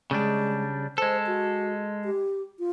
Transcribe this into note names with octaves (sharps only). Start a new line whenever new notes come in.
C#3 G3 G#3 D4
G#3 A4 C5
F#4
G4
F4